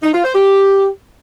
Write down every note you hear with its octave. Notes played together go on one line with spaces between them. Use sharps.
D#4
F4
C5
G4